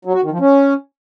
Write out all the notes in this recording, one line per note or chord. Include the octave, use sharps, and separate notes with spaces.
F#3
F#4
D#3
F3
C#4